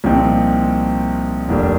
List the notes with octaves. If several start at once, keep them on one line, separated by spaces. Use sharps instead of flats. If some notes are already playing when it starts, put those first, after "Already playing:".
C2 A#2 F3 C4 D#4
F1 D#2 D#3 G3 D4